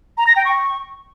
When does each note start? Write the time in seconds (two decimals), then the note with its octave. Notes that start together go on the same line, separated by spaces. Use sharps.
0.18 A#5
0.27 A#6
0.36 G5
0.45 C#6